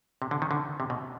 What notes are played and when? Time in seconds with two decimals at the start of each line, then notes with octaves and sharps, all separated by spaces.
0.22 C3
0.31 D3
0.42 D#3
0.51 D3
0.80 C3
0.90 B2